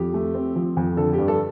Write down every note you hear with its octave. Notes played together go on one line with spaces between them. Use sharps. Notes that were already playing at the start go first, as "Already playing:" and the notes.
Already playing: F2 G4
A3
C4
F3
F2
D3 A4
G2 G4
A4